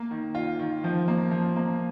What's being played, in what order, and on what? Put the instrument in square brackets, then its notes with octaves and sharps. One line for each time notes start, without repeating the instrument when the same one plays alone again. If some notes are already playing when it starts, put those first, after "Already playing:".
Already playing: [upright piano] A#3
D#3
F4
D#3
F3
A#3
F3
A#3